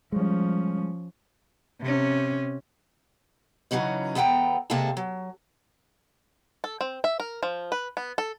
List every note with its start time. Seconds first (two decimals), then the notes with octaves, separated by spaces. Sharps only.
0.12 F3 G3 G#3 C#4
1.81 C3 C#4
3.71 C#3 E3 F#3 C#4 D#4
4.15 E2 B3 A4 F5 G5 A#5
4.70 C3 G#3 A#3 A4 F5 A5
4.97 F#3
6.64 A4
6.81 C4
7.04 E5
7.20 A#4
7.43 F3
7.72 B4
7.97 B3
8.18 A4